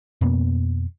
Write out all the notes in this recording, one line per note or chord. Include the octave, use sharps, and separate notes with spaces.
F2 B2 A#3 B3